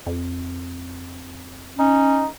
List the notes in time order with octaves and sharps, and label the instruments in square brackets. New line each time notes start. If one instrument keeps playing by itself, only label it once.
[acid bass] F2
[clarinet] C#4 [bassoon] D#4